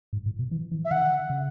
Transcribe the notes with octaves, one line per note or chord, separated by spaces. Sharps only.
G#2
A2
B2
E3
E3
E5
D3 F#5
C#3